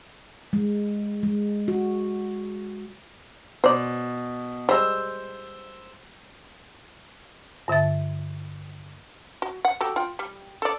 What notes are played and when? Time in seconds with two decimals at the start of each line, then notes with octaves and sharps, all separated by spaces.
0.53 G#3
1.23 G#3
1.68 F#4
3.64 B2 C5 D5
4.69 G3 G#3 C5 E6
7.68 G2 D3 E5 A6
9.42 F#4
9.65 F#5
9.81 F#4 G4 A4
9.96 F4 G5
10.19 G3
10.62 A4 D5